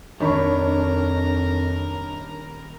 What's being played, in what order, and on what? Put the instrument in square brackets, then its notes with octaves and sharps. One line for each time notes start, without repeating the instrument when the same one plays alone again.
[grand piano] D#1 B5 C#6 [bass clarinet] F2 [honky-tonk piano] D#3 D4 C#5 [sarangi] A#4